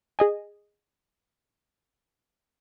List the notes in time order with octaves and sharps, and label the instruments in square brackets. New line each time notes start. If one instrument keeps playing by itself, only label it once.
[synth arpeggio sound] G#4 D#5 G#5